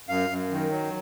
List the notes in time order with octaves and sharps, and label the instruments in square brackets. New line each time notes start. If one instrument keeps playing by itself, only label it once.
[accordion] F#2 F5
F#2
D#3
F#3